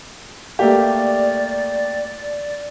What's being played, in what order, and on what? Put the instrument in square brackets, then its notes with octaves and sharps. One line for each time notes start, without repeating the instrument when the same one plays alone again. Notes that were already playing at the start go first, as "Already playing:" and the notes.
[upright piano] A3 A#3 G4 [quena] D5